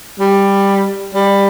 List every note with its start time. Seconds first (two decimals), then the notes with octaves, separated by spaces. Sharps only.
0.19 G3
1.14 G3